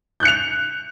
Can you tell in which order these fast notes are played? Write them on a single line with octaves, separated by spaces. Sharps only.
G6 F#6 C#7 F7